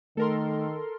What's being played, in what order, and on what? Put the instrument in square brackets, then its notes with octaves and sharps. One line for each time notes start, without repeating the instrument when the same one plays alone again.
[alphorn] D#3 [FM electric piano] A3 [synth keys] A4 A#4 C6